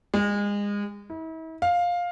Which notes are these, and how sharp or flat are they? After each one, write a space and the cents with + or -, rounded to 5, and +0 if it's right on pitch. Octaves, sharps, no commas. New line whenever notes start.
G#3 -30
E4 -40
F5 +10